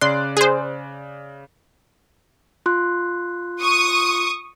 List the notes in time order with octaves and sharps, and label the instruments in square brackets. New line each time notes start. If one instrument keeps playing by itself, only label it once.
[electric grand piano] C#3 D5 F#6 [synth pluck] C6
[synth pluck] G#4 C5
[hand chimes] F4 C6 F#6
[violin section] C#6 D#6